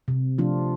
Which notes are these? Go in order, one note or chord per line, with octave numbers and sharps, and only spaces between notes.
C3
F3 A3 D4 F4